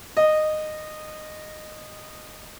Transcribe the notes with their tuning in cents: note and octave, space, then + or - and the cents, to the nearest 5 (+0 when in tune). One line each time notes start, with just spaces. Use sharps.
D#5 -15